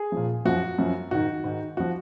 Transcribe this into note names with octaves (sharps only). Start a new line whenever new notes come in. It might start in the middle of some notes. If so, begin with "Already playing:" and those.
Already playing: G#4
A#2 F3
F#2 F3 F#4
F#2 F3
G#2 D#3 F#4
G#2 D#3
F3 F#4